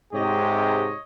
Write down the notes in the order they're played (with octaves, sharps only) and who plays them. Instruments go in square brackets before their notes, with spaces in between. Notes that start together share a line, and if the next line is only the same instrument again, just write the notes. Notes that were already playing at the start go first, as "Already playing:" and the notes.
[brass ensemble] G#2 C3 [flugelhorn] G4 [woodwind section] C#5 D#5